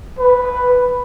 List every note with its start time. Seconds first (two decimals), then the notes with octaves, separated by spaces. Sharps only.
0.19 B4